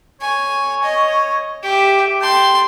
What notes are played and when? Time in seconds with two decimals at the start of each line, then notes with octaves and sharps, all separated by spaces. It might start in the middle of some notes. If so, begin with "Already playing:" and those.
0.21 C#5 G#5
0.83 D#5
1.63 G4 E5 D6
2.21 G5 A5 C6